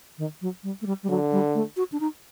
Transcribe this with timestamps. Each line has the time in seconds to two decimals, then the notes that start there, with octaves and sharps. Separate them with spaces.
0.18 D#3
0.41 F#3
0.63 G3
0.82 A3
0.86 G3
1.03 G3
1.09 D3 F#3
1.32 G3
1.54 A3
1.77 F#4
1.92 D4
2.00 D#4